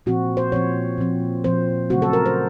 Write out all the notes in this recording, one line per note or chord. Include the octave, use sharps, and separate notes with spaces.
A#2 F3 C4 F#4
C5
A#2 F3 C4 C#5
A#2 F3 C4
A#2 F3 C4 C5
C#3 F#3 A3 C4 F#4
A4
A#4
C5